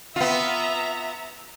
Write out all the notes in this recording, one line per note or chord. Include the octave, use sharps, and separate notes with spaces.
B3 F4 E5 A#5